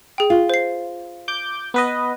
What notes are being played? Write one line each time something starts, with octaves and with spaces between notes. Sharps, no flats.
G#4 G5
F4
C5 C7
D6 G6
B3 B4 D#5